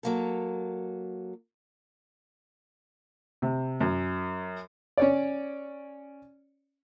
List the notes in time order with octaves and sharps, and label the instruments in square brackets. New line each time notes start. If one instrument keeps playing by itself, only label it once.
[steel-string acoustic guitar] F#3 A#3 A4
[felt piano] C3
F#2
[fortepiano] C#4 C#5 D5